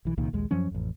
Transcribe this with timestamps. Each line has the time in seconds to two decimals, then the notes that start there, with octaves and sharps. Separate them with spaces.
0.05 B1 E3
0.17 C2 A#2 D#3
0.33 A#1 D#2 G#3
0.51 F#2 F3 F#3 C#4
0.71 A1 F2